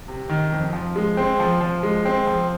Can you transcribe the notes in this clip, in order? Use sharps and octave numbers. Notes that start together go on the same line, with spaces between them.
C3
D#3
F2
F3
G#3
C4
F3
F3
G#3
C4
F3